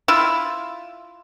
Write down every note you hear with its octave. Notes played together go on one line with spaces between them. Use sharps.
E4 F4